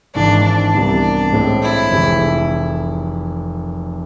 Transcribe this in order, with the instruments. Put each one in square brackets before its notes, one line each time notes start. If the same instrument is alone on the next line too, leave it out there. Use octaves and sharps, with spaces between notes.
[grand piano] G#1 G#2 E3 [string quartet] D4
[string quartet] D4
[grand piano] C2 C3 E3 B3
A2 G#3 C4 E4
[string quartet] E4
[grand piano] F1 F2 E3 G#3